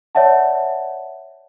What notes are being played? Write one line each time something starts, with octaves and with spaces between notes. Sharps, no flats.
C#5 D5 E5 F#5 A5